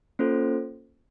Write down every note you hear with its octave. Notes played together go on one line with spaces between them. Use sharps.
A#3 C#4 F4 A4 C5